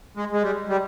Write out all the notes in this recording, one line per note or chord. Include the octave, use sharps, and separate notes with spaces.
G#3
G#3
G3
G3